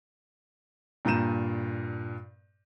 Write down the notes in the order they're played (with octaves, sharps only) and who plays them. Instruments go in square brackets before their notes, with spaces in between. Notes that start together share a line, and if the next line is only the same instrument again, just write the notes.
[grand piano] G2 A#2 A#5 G6 D#7 E7